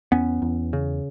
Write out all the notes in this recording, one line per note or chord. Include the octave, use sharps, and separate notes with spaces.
E2 B3 C#4
E2
C#3